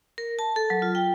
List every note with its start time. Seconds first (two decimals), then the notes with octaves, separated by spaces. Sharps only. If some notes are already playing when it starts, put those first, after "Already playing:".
0.18 A#4
0.39 A5
0.56 A4
0.70 F#3
0.82 F4
0.95 G5